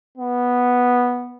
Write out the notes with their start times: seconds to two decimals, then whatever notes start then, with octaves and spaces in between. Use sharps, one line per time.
0.18 B3